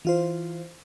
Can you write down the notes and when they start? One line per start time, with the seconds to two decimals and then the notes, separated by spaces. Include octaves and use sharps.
0.05 E3 F4 C5